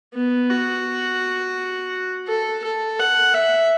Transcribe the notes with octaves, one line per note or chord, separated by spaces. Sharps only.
B3
F#4
A4
A4
F#5
E5